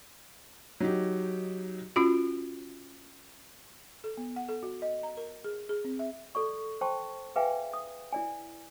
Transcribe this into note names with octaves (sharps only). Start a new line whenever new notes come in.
F#3 D#4 G4
C#4 F4 F#4
A4
B3
F#5
A4
F#4
D#5
A#5
A#4
G#4
G#4
C4
E5
A4 D5 C#6
C5 G5 A5 C6 C#6
G#4 B4 E5 F5 G5 G#5
D#6
E4 D5 G#5